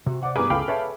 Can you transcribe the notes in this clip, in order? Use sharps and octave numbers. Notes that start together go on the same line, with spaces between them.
C3 F#4
C5 D5 F#5 D6
G2 B3 G#4 A#4 B4 D6
C#2 G#4 A4 F5 G5 B5
B4 C#5 E5 A5